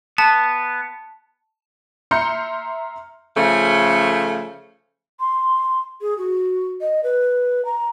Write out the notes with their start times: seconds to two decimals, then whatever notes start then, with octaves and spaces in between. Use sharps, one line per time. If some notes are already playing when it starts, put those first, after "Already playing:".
0.18 B3 A5
2.11 E5 A#5 C6 F6 G6 C#7
3.36 C#3 F3 A3
5.20 C6
6.01 G#4
6.18 F#4
6.81 D#5
7.03 B4
7.65 A#5